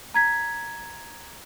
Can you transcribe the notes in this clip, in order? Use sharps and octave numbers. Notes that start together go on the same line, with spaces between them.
A#5 G#6 B6